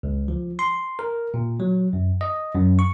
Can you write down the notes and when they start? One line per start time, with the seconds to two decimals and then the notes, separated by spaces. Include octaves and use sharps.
0.03 C#2
0.28 F3
0.59 C6
0.99 A#4
1.34 A#2
1.60 F#3
1.93 F#2
2.21 D#5
2.55 F#2
2.79 C#6